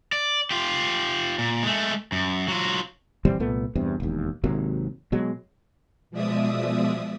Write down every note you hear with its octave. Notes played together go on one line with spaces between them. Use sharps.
D5
F4 G4
A#2
G#3 A3
F#2
F#3 F4
D#1 E3 G3 C4
C2 A#2 A3 B3
E2 G2 C3
E1 D#2
G#1 C3 F#3 A#3
B2 F#3 G#3
B2 F3 G#3 D5 E5 D#6